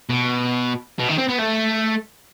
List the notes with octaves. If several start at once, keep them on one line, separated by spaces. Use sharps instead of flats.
B2
B2
D#3
C4
B3
A3